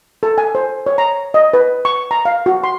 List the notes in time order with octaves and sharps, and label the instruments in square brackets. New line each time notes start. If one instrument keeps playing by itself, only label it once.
[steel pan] A4
G#5
C5
C#5
A#5
D#5
B4
C#6
A#5
F5
F#4
C6